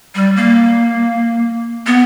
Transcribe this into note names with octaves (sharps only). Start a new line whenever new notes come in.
G3
A#3
B3